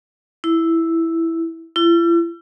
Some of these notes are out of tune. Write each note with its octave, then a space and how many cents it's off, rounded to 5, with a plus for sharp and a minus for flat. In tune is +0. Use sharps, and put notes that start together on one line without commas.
E4 +0
E4 +45